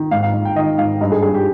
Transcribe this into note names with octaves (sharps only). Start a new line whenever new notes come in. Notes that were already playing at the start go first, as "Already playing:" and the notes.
Already playing: D#3
G#2 F5
F5
G#2
G5
D#3 D#5
G#2 F5
G2 D#5
G#4
G2 G#4
G4